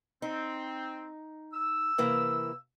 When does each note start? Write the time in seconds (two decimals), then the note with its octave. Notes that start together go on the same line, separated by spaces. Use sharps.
0.22 C4 D#4
1.53 E6
1.98 C3 E3 A#3